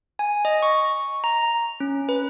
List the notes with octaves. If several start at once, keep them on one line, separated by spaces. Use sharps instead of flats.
G#5
D#5
C#6
A#5
C#4
B4